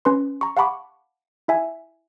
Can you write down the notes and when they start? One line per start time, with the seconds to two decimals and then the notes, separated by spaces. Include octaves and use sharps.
0.05 C#4 B4 C6
0.41 A#5 C#6
0.57 F5 F#5 A5 B5 C#6 D6
1.48 E4 E5 G#5